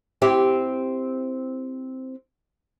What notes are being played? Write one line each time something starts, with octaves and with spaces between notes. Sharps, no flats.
C4 E4 G4